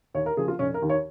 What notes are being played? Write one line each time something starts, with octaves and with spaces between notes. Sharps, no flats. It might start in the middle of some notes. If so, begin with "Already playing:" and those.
D#2 C#5
A#4
C#3 F3 G#4
F4
F1 C#4
A#4
D#2 D#3
C#5